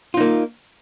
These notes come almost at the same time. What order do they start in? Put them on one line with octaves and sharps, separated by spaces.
F4 D#4 A#3